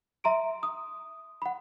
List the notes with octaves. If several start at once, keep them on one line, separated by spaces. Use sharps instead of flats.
E5 A#5 C6 D7
D#6
F#5 B5